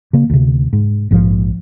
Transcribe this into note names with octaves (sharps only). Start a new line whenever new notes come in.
C#3 A#3
D2 C3
G#2
A#1 G#2 D#3 F3